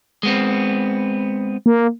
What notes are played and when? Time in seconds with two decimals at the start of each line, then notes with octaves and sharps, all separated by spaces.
0.23 G#3 B3 C4
1.66 A#3